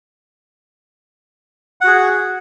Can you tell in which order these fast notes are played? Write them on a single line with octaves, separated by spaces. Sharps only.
F#5 F#4 G#4